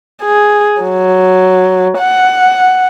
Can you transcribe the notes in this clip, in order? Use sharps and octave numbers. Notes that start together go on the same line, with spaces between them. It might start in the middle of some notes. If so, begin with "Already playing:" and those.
G#4
F#3
F#5